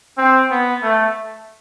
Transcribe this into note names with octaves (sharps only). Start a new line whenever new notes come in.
C4
B3
A3